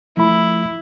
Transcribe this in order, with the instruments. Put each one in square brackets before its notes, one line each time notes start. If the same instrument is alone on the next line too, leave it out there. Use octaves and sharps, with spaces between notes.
[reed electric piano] F3 A3 B5 [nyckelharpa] E4